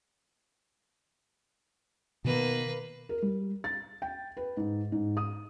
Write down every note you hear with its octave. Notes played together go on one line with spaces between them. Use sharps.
B2 D#3 A#3 B3 B4
A#4
G3
A6
G5
B4
G#2
G#2
D#6